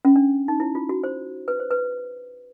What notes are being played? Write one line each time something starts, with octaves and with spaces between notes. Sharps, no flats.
C#4
D4
D#4
E4
F4
F#4
C5
B4
C5
B4